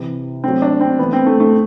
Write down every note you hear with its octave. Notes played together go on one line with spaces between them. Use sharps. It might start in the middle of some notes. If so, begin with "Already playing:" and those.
Already playing: C3 E3
A2 F#3 C4
D4
C4
A2 E3 B3
C4
A3
A3